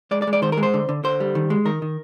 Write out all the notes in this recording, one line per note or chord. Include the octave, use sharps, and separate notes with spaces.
G#3 D5
D5
G#3
D5
D#3 C5
A#4
G#3
C5
D3
D3
D3 C5
G3
D#3
G#3
D#3 A#4
D#3